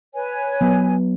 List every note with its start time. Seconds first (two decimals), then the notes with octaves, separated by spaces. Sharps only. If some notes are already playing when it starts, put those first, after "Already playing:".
0.14 B4 C#5 G#5
0.61 F#3 B3